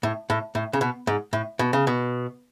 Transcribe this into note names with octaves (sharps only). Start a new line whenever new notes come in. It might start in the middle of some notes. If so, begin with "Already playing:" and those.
A2
A2
A2
C#3
B2
G#2
A2
B2
C#3
B2